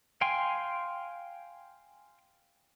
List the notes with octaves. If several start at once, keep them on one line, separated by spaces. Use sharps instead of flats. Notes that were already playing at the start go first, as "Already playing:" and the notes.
F5 G5 G#5 C6